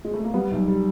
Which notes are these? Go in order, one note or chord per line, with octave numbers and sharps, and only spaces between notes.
G#3
A3
A#3
G3 B3
B1
G3